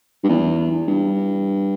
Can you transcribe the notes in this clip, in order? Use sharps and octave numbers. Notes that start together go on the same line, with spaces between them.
G2
E2
G2